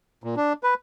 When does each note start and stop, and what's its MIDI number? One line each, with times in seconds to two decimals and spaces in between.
0.24 0.35 46
0.36 0.53 62
0.63 0.74 71